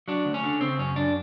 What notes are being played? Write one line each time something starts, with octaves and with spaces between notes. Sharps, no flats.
F#3 D4
D2
C#4
D3
C#3 C4
F#2 C#4
F#2 D4